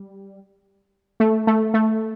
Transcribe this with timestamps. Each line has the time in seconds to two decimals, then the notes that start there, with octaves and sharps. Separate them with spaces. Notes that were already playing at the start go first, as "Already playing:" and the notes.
Already playing: G3
1.20 A3
1.47 A3
1.74 A3